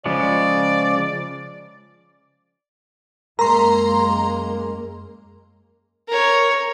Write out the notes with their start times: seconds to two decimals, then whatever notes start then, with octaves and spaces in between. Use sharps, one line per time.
0.06 C#3 F3 G#3 D5
3.39 F#2 G#3 A#3 A#4 A#5 C6
6.08 A#4 C#5